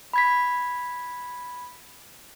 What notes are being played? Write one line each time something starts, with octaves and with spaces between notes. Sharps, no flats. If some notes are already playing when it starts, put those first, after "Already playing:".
B5 G#6 B6